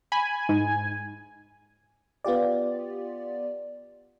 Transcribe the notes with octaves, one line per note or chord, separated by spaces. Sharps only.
G#5 B5
G#2
B3 F4 G4 D5